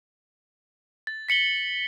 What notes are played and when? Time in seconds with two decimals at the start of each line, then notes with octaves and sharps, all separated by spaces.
1.07 A6
1.29 B6 C#7 F#7 G7